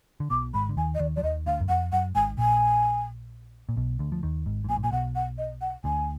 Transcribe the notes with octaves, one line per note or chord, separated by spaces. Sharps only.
D3
B1 B2 D6
G#1 G#2 B5
D3
D#2 D#3 G#5
D#5
D#2 D#3 D5
F3 D5
D#2 D#3 D#5
D2 D3 F5
F#2
F2 F#5
F#2 F#5
G#1 G#2 G#5
A#1 A#2 G#5
A#2
B1 B2
D2 D3
F3
D#2 D#3
G#1 G#2
G#2
A#1 A#2 G#5
G#2
A#2 G#5
B1 B2 F#5
F#5
D#5
F#5
D2 D3 G#5